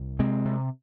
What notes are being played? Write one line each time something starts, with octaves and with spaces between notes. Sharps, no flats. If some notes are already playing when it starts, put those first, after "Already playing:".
Already playing: C2
C3 G#3 C4
C3